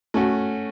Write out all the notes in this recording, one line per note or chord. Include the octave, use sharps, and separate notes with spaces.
A3 C#4 F#4